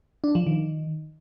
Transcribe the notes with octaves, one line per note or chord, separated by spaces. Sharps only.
D4
F3
D#3